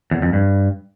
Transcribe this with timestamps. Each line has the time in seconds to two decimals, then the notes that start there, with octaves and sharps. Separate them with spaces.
0.11 E2
0.22 F2
0.33 G2